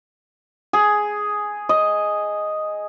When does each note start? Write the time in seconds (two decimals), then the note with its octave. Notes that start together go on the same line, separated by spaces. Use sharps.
0.73 G#4
1.69 D#5